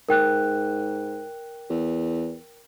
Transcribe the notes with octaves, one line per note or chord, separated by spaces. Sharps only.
G#2 A#4 G5 F#6
E2